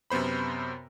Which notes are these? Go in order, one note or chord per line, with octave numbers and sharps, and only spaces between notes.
F#2 C3 B3 C5 B5